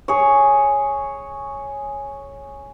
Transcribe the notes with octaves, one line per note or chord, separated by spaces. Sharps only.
G#4 C#5